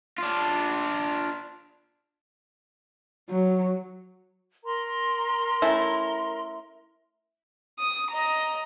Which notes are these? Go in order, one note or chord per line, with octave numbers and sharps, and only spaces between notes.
D4 F4
F#3
A#4 A#5 C6
A3 C#4 E4
D#6
D#5 A#5